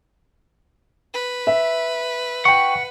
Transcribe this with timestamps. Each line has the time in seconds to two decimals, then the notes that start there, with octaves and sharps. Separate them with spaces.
1.14 B4
1.47 E5
2.45 F#5 G5 C#6